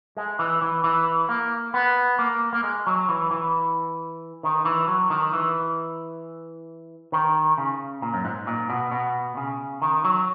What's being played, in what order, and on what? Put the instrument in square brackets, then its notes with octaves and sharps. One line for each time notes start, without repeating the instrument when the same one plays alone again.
[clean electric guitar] G#3
E3
E3
E3
A#3
B3
A#3
A#3
G#3
F#3
E3
E3
D#3
E3
F#3
D#3
E3
D#3
C#3
A#2
F#2
G#2
A#2
B2
B2
C#3
D#3
F#3